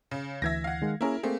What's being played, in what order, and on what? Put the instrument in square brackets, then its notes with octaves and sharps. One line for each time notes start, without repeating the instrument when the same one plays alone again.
[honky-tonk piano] C#3
[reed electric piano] D2 E3 [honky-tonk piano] E5 G#6 A#6
[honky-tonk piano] F5 F#5
[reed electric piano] D#3 G#3
[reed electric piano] A#3 C#4 G#4 [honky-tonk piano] E4 A#4
[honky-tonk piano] A3 A#3 [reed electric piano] C4 G#4